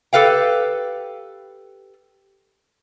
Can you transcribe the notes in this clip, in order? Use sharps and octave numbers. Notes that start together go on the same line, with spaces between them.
G4 A4 B4 F5 G5